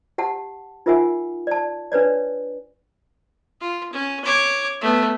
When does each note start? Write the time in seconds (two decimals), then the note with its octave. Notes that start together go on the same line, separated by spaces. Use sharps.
0.18 G4 F#5 A5
0.86 D#4 F4 A#4 E5 F#5 G#5
1.47 D5 A5
1.92 D4 B4 C#5 D5
3.61 F4
3.92 C#4
4.24 C#5 D6
4.81 A3 B3